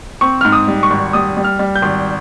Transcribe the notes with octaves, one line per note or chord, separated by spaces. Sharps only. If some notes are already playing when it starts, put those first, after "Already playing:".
C4 C#6
G#2 F6
D#6
G3
C#6
G#1
G3 D#6
G3
F6
G3
G6
G#1